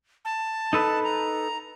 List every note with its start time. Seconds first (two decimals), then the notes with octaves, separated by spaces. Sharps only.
0.25 A5
0.73 D#4 A4 B4
1.04 A#5